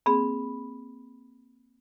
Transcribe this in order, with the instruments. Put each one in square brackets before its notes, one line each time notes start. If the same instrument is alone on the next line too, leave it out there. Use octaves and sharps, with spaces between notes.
[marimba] A#3 C4 G#4 [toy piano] B5